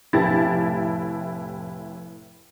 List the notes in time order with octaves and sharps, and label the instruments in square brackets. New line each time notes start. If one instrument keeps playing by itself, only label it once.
[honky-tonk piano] F1 A2 E4 G4 A5 A6